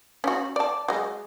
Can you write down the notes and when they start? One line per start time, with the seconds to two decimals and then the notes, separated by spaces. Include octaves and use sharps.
0.24 C#4 D4 F#4
0.56 D5 A5
0.88 F#3 G#3